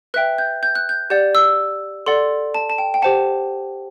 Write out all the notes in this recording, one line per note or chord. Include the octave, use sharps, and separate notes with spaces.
B4 E5 G5 F#6
G6
G6
F#6
G6
G4 D5 F#5 G6
E6
A4 D5 F#5 C6
A5
A5
G5
G5
G4 C5 F#5 A5